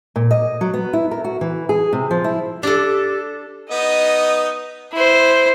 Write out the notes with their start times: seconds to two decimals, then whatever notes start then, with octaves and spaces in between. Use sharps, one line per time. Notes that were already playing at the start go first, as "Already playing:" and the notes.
0.16 A#2
0.31 D#5
0.61 F#3
0.74 B3
0.93 E4
1.11 A#4
1.24 F#4
1.41 E3
1.69 G#4
1.93 C3
2.11 F3
2.24 E4
2.63 D4 G4 A4
3.72 B3 D#4 D#5
4.93 E4 C5